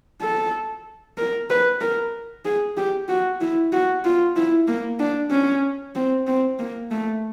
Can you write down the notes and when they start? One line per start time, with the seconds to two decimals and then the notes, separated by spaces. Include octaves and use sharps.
0.22 A4
1.18 A#4
1.50 B4
1.81 A#4
2.45 G#4
2.77 G4
3.09 F#4
3.41 E4
3.72 F#4
4.05 F4
4.36 E4
4.68 A#3
5.00 D4
5.31 C#4
5.95 C4
6.27 C4
6.59 A#3
6.91 A3